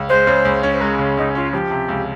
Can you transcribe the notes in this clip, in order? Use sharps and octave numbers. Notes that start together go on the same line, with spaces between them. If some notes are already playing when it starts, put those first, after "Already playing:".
Already playing: C#2
G#3 C5
C#3
C#2
C#4
C5
G#3 A#4
C#3
C#2 D#4
C#4 F4
F3 G4
C3
C#2